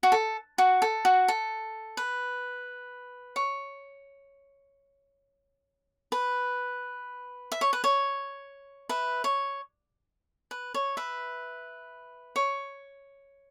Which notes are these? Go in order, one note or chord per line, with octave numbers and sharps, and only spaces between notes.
F#4
A4
F#4
A4
F#4
A4
B4
C#5
B4
E5
C#5
B4
C#5
B4 E5
C#5
B4
C#5
B4 E5
C#5